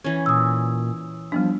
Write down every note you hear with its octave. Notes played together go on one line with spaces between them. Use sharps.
E3 C#4
A#2 D#6 E6
F3 G3 B3 D4